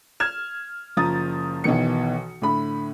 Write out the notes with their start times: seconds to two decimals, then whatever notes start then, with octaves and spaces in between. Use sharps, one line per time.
0.20 F6 G#6 E7
0.97 F#1 F3 A#5 D#6 A6
1.64 B1 B2 D#3 E3 C#7
2.42 A2 D3 B5